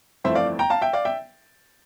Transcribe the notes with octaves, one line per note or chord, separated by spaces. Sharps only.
G1 F2 E3 A3 C4 C5 E5
D5 F5
G5 A#5
F5 A5
E5 G5
D5 F5
E5 G5